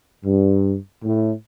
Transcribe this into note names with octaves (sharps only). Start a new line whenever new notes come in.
G2
A2